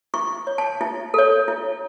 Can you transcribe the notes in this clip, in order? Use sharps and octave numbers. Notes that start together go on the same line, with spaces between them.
E4 C#6
C#5
A5
E4
A4 C#5
E4